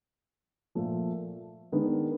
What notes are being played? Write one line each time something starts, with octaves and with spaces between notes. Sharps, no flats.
A#2 F3 A3
D#3 G#3 B3 D4